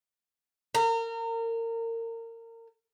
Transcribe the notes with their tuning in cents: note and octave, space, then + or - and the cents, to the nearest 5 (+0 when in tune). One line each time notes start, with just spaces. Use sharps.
A#4 -30